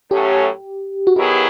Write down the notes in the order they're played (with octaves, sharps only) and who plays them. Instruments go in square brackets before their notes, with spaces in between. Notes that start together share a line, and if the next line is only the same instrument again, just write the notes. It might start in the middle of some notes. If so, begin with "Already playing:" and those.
[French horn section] A2 F#3 A3 C#4 [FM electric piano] G4
[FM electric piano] F#4
[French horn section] D#3 F#3 B3 E4 G#4 [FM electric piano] G4